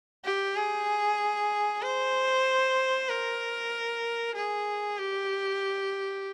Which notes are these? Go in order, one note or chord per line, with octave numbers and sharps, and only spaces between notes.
G4
G#4
C5
A#4
G#4
G4